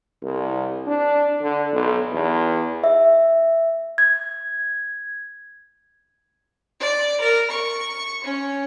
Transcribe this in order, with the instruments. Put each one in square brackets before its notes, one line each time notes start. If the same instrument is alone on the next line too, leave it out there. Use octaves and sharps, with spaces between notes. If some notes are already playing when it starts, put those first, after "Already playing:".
[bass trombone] C2
D4
D3
B1
E2
[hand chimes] E5
G#6
[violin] D5
A#4
C#6
C#4